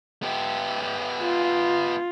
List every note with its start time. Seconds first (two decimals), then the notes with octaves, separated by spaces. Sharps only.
0.23 B3 G4
1.22 F4